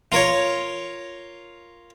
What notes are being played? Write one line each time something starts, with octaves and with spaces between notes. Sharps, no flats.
F4 A#4 C#5